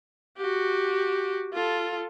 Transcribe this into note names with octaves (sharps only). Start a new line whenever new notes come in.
F#4 G4
F4 A4